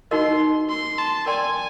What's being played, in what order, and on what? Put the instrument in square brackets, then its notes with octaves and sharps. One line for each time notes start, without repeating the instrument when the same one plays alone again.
[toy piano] D#4 F#4 A#4 D#5 [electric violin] C6
[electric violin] C6
A5
[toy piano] A#4 D5 G5 C6 [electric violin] G#5